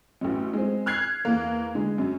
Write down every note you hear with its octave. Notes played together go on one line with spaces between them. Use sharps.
A1 F#2
G#3 C4
F6 F#6 G#6 C7
E2 A#3
D3 G#3
F#2